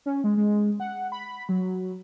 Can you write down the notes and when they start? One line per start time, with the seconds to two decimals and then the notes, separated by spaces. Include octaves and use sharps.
0.06 C#4
0.24 G#3
0.37 G#3
0.80 F#5
1.12 B5
1.49 F#3